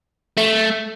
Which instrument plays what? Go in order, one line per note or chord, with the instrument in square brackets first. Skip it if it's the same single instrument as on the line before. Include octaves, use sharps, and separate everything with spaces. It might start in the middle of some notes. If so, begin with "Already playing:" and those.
[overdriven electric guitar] A3